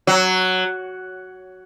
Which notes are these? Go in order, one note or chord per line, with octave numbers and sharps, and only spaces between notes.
F#3